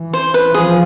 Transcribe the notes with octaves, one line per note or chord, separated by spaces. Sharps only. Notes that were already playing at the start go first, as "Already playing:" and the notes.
Already playing: E3
C5
B4
F3 G#4